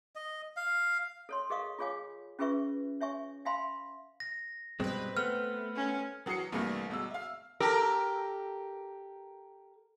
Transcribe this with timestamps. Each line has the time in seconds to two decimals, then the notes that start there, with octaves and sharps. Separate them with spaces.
0.16 D#5
0.56 F5
1.29 A4 C#5 C6
1.50 G#4 A#4 D#5 F5 C#6 D#6
1.79 F4 G#4 C#5 F5 G#5 D6
2.39 C#4 F4 G#4 B4 E5 C#6
3.01 C#5 E5 G#5 C#6
3.45 E5 F5 G#5 B5 C6
4.20 A#6
4.80 G2 B2 G#3 C4 B4
5.17 A3 B3 F6
5.76 C#4
6.26 E3 F#3 D#6 C7 C#7
6.52 A#1 G2 C3 E3 A3 A#3
6.90 G1 B2 G#3 E6
7.10 E5 F5
7.60 G4 A4 A#4